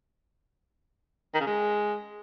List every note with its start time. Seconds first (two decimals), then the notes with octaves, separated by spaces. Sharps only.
1.34 D#3
1.40 C#3
1.47 G#3